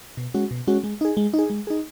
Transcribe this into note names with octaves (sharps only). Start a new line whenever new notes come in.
B2
G#3 C#4 F#4
B2
G#3 C#4 F#4
G#3
D#4 G#4
G#3
D#4
G#4
G#3
D#4 G#4